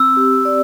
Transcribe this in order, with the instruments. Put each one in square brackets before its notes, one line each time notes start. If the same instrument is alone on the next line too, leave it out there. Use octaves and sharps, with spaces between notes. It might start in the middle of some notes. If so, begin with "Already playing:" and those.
Already playing: [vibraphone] C4 [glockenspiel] E6
[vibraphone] G4
D5